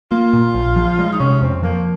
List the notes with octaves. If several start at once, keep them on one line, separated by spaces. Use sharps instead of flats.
A#3 F4
A#2
A#1
F3
G#3
D#4
C3 C#4
F2 C4
F3 A#3